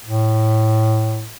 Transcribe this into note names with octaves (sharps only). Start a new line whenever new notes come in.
A2